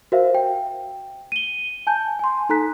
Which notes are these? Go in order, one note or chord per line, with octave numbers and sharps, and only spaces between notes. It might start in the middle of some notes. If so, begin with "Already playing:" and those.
F#4 A#4 C5 E5 F5
G5
D#7 G7
G#5 A5 G6
G#5 C6
D#4 A4 A#5 F#6 B6